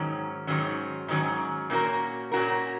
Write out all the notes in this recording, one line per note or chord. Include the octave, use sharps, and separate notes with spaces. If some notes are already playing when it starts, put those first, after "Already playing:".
Already playing: G#2 D#3 F#3 C#4
G#2 D#3 F#3 C#4
G#2 D#3 F#3 C#4
A#2 A#3 C#4 F#4 A#4
A#2 A#3 C#4 F#4 A#4